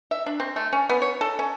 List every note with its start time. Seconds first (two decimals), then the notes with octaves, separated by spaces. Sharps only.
0.11 E5
0.26 D4
0.40 C4
0.56 A3
0.73 C#4
0.89 B3
1.02 C#5
1.21 A4
1.39 C#4